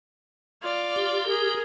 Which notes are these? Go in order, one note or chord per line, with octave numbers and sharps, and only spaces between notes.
F4 D5
G4
G#4 A#4